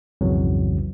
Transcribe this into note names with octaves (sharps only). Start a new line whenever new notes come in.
B1 F2 G#2 C#3 E3 F#3